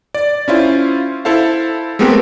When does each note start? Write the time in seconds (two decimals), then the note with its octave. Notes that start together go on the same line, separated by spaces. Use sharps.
0.15 D5
0.48 C#4 E4 F4 C5
1.25 E4 A4 C5 F5
1.99 G#3 A3 B3 C4 G4 A#4